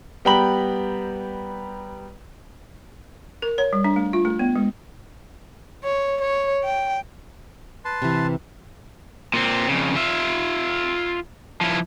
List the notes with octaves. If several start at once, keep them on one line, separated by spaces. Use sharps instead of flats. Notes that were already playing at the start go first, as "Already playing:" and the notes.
G3 B3 G5 A#5 B5 F#7
A#4
C#5
G3
D4
A3
F4
A3
B3
G#3
C#5
C#5
G5
B4 A5 C6
C3 E3
A#2 C4
F2 C#3
F4 E5
F3 E4